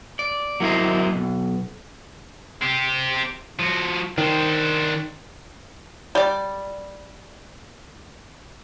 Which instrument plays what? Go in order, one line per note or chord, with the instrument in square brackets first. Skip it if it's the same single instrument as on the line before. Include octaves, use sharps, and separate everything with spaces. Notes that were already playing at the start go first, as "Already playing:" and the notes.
[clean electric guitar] D5
F#3 A#3 E4 B4 C5 D#5
B1
[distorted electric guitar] C4 G4
F3 F#4
[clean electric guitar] D#3 [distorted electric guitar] D4 C5
[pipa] G3 D5